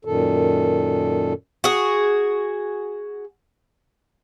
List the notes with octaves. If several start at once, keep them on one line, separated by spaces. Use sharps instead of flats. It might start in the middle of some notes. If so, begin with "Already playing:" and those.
F#2 A#2 D#3 A4
F#4 G#4